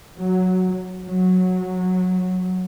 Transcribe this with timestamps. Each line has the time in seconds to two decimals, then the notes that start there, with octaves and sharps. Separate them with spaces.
0.17 F#3
1.04 F#3